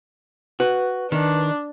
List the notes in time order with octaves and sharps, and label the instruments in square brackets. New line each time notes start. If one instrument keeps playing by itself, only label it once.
[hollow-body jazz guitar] F#4 [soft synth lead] B4
[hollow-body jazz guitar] D#3 [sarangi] D4